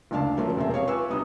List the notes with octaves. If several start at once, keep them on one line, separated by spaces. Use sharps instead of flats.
F#1 D2 D4 F5 A5
F3 F#3 A3 A#3 C#4
E1 C3 A#3 C4 E5
G4 C#5 F5 C#6
F4 B4 G#5 C#6 D6 E6
G2 C3 B3 D#4 D#6